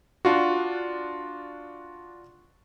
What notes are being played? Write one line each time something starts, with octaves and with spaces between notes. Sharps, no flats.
D4 F4 F#4